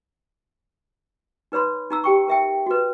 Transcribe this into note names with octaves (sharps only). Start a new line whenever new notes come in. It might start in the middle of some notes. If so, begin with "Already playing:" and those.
D#4 B4 C#5 B5 C6
D#4 A#5 E6
G4 G5 C#6
A#4 E5 G5
F#4 B4